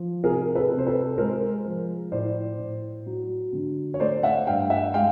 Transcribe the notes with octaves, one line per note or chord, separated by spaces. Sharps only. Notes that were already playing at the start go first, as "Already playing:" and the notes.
Already playing: F3
C3 G#4 A#4
A4 B4
C3
C5
A4 B4
G#3 A#4 C5
F3
A2 C5 D5
A2
F#3
D3
C#5
A3 C5 D5
E5 F#5
G2 F5 G5
E5 F#5
G#3 F5 G5